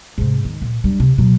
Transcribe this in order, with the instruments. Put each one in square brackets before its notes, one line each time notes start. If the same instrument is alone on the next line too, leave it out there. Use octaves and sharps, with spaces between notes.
[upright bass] G#2 C3
D#3
A#2
G3 D4
C3
B2 F#3